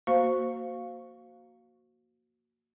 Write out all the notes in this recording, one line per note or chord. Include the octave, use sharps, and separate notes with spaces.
A#3 F#4 C5 F5 C#6